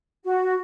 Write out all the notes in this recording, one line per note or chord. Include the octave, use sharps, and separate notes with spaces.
F#4